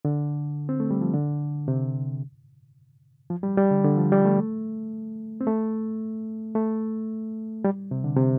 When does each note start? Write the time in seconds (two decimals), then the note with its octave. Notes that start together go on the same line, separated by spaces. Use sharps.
0.05 D3
0.69 C4
0.80 A3
0.91 G3
1.01 F3
1.14 D3
1.68 C3
3.30 F3
3.43 G3
3.57 G3
3.71 D3
3.84 D3
3.97 F3
4.12 G3
4.25 A3
5.41 C4
5.47 A3
6.55 A3
7.64 G3
7.91 C3
8.04 D3
8.16 C3